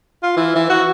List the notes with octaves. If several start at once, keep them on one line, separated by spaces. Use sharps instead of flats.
F4
E3
E3
F#4